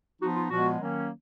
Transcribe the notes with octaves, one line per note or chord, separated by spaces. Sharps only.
F3 B3 D#4 F#4
F4
A#2 F3 G#3 B3 F#4
D#3 F#3 A#3 C#4